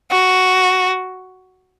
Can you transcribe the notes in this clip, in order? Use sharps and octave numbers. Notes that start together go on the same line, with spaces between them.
F#4